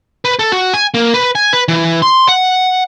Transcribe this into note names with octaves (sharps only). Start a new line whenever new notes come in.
B4
A4
F#4
G#5
A#3
B4
G#5
B4
E3
C6
F#5